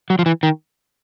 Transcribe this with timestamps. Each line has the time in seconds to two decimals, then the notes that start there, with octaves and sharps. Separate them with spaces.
0.10 F#3
0.19 F3
0.26 E3
0.43 D#3